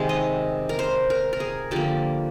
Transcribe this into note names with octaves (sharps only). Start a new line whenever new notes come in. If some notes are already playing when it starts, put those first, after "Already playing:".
Already playing: C3 D#3 G#3
D#5
A#4
C5
A#4
A#4
G#4
D3 F3 A#3 G4